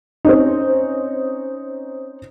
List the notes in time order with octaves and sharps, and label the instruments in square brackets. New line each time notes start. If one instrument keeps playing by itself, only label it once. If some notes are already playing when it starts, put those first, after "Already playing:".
[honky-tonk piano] C4 C#4 D#4